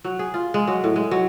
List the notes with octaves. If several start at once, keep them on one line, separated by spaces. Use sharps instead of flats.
F#3
G#4
F4
G#3
F#3
A2
G#3
F#3